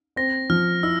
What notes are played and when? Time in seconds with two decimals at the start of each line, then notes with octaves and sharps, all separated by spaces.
0.16 C4 A#6
0.50 F3 F6
0.83 E4 E6